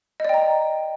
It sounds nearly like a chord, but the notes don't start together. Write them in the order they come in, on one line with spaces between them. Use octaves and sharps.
D#5 D5 G5 A#5